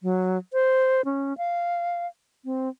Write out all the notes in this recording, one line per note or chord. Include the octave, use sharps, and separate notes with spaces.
F#3
C5
C#4
F5
C4